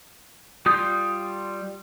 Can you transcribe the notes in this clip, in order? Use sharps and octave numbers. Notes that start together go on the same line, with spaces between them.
G3 F4 D#6 G6